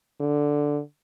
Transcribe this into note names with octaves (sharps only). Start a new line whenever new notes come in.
D3